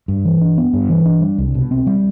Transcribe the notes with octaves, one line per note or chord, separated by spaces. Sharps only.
G2
E3
D4
B3
G2
E3
D4
G3
C2
B2
C4
G3